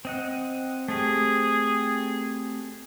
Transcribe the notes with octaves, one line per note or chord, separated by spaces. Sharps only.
C4 D#5 F#5
A3 C4 G4 G#4